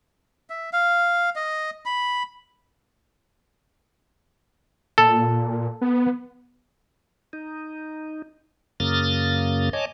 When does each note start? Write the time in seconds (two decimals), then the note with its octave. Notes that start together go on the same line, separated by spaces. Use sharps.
0.50 E5
0.73 F5
1.36 D#5
1.86 B5
4.98 A#2 A4
5.81 B3
7.33 D#4
8.80 F#2 C#3 A#3 D#6 F6 A6
9.73 C#5 D#5 G#5 A5 D6